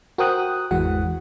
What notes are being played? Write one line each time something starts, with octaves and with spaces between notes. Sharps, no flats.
F#4 A#4 C5 G5 D#6 F#6
G#1 E2 E3 G#3 F#4 F#5